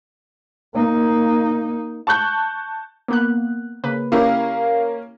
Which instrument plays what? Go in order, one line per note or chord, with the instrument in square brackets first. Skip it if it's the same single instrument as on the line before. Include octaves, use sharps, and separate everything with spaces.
[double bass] A#3 D#4
[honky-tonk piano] A5 C#6 F#6 G6
[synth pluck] A#3 B3 F#6
C#3 A#3 B4
[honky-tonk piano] A#3 C#4 A#4 [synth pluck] E4 G4 [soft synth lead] F5